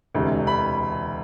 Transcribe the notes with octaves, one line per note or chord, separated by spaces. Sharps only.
E1 D2 C3 E3 G#3
B5